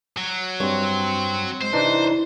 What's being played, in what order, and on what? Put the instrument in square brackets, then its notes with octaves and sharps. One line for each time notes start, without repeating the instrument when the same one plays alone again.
[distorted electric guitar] F#3
[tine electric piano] G2 [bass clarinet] C4 [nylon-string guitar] C#5
[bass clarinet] G#3 [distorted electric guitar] C5
[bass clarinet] C3 [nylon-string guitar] E3 [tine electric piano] D4 D#4 B4